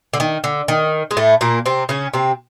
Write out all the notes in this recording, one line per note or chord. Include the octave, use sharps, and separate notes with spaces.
D3
D#3
D3
D#3
G#3
A2 A3
A#2 A#3
C3 C4
C#3 C#4
C3 C4